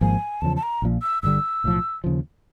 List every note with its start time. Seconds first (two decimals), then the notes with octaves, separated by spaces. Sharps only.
0.01 G#1 G#2 F3 A#3 G#5
0.41 E2 C#3 F3 A5
0.56 A5
0.63 A#5
0.82 A#1 A#2 F3
1.02 E6
1.23 G1 G2 D3 G3 E6
1.64 B1 A2 F3
2.04 D#2 C#3 F3